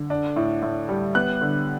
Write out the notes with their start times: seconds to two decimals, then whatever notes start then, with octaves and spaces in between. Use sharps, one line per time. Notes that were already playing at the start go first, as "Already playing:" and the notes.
Already playing: D3
0.10 D4
0.36 A2
0.62 A2
0.89 G3
1.15 B3 F#6
1.41 D3